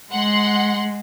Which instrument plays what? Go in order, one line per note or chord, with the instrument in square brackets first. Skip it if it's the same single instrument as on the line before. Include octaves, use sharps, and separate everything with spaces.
[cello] G#3 [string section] F#5 C6